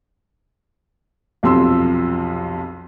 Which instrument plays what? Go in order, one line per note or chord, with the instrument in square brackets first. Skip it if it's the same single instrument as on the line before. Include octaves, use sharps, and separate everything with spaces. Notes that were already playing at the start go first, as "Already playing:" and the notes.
[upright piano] B1 F2 C3 C6 E6